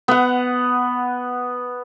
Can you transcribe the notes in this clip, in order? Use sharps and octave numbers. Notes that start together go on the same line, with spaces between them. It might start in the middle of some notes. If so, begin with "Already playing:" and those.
B3 F#5